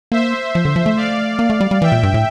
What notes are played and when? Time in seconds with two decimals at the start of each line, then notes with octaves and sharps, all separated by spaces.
0.12 A#3 C5 E5
0.55 F3
0.65 D3
0.76 F3
0.86 A3
0.97 D5 F5
1.39 A#3
1.50 A3
1.61 G3
1.71 G3
1.82 E3 E5 G5
1.92 A#2
2.03 G2
2.14 A2